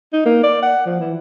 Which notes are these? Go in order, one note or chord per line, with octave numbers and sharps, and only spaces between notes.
D#4
A#3
D5
F#5
F3
E3